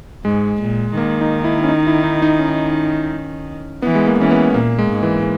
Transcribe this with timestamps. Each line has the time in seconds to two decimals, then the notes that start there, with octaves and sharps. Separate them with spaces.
0.25 G#2 G#3
0.61 A#2
0.97 D#3 A#3
1.21 D#4
1.44 E4
1.63 C#4
1.69 D#4
1.87 E4
2.04 D#4
2.22 D#4
2.39 C#4
3.82 E3 B3
3.95 G#3
4.07 A#3
4.19 E3 C#4
4.31 B3
4.54 A#2 A#3
4.79 G#3
4.90 G#2
5.03 E3